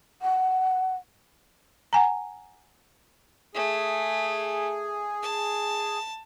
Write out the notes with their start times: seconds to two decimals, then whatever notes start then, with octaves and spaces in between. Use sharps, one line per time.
0.22 F#5
1.93 F#5 G#5 A#5
3.55 A3 G#4
5.23 A5